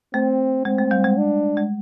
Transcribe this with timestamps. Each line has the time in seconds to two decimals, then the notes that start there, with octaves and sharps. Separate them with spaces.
0.14 A3 C4
0.65 G#3 C4
0.79 A3
0.91 G3
1.04 G#3
1.18 D4
1.57 G#3